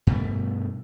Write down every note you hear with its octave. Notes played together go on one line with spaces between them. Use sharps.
G2 B2 A3